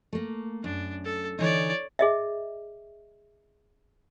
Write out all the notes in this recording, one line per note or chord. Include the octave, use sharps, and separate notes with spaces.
A3 A#3
F#2 D4
A4
D3 E3 D#4 C#5 D5
G#4 D#5 E5